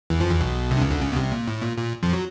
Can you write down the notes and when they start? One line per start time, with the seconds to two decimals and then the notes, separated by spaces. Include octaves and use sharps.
0.10 E2 E3
0.20 F2 F3
0.31 E2 E3
0.40 B1 B2
0.71 C2 C3
0.77 D3
0.81 C#2 C#3
0.91 D2 D3
1.01 C#2 C#3
1.12 B2
1.16 C2 C3
1.32 A#2
1.47 A2
1.62 A#2
1.77 A#2
2.03 F2 F3
2.13 F#3